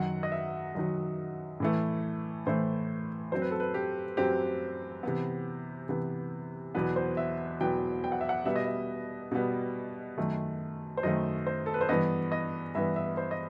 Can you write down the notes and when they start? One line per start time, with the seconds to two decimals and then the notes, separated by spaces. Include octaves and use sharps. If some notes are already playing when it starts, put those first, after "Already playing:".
Already playing: F#2 D#3 F#3 F#5
0.23 D#5
0.32 E5
0.75 F#2 D#3 F#3
1.60 A2 E3 A3
2.46 A2 E3 A3 C5
3.32 F#2 F#3 C4 C5
3.42 B4
3.51 A4
3.60 B4
3.74 G4
4.17 F#2 F#3 C4 G4
5.03 C3 E3 B3
5.89 C3 E3 B3
6.75 E2 B2 F#3 B3 B4
6.96 C5
7.17 E5
7.61 E2 B2 F#3 B3 G5
8.04 G5
8.12 F#5
8.21 E5
8.29 F#5
8.46 B2 G3 B3 E5
8.56 D#5
8.66 E5
9.32 B2 G3 B3
10.18 F#2 D#3 A3
10.97 C5
11.03 F#2 D#3 A3 D#5
11.47 C5
11.66 A4
11.74 B4
11.81 C5
11.89 G2 E3 B3 D#5
12.32 D#5
12.75 G2 E3 B3 E5
12.96 E5
13.17 C5
13.31 D#5